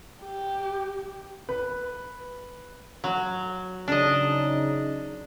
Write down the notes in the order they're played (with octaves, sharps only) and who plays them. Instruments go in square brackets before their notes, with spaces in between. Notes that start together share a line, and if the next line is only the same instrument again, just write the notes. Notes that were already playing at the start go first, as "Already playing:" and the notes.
[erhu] G4
[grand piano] B4
[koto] F#3
[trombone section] C#3 D#4 [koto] D4 D#5